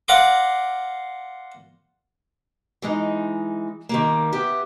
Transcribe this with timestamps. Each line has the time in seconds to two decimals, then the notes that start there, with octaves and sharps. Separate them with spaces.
0.08 D5 F5 F#5 A#5 C6 D6
2.82 E3 G#3 D#4
3.89 D#3 G3 A#3
4.32 B3 G4 E5